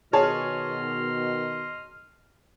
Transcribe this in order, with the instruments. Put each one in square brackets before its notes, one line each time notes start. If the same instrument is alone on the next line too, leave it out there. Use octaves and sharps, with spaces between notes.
[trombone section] B2 D#3 [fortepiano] G#4 C#5 A5 [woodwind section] D#5 C6 F6